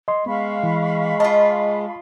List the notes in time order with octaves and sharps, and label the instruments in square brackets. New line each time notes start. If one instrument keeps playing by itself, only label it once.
[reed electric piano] D#5 C6
[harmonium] G#3 [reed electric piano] B3 [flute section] F5 B5 C#6
[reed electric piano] E3
[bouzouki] F4 D#5 [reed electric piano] A5